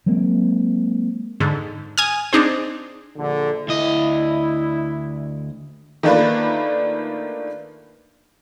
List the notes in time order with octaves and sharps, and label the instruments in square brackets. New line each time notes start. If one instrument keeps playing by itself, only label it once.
[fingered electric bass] F#3 G#3 A#3 C4
[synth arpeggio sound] G#2 D3
G#5 D#6 F6
C4 D4 D#4 G#4 C5
[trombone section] A#1 D3
[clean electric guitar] D2 D#5 [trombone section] E4
[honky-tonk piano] D#3 A3 A#3 D4 F4 B4